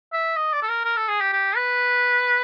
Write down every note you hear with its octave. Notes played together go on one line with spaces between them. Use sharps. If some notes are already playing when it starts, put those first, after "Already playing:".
E5
D#5
D5
A4
A#4
A#4
A4
G#4
G4
G4
B4